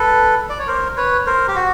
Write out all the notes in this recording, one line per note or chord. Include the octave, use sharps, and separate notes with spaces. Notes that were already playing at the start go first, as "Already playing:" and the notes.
Already playing: A4 B4
D5
C#5
A#4 C5
B4 C#5
A#4 C5
G4
F#4